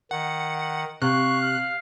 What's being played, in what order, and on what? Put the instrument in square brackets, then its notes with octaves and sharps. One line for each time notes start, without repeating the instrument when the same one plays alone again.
[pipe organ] D#3 [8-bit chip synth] F#5
[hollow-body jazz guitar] C3 [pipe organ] F5 [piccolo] C#6 [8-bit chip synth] F#6
[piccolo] F6